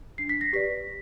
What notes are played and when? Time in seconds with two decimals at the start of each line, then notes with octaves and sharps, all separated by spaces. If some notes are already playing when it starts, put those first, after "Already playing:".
0.18 D4 C7
0.29 B6
0.41 A#6
0.53 G4 B4 D5 B6